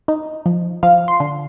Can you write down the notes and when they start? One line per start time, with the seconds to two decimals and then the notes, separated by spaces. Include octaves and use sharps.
0.08 D#4
0.46 F3
0.83 F3 F5
1.08 C6
1.20 D3